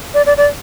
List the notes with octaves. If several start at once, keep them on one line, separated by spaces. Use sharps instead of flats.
D5
D5
D5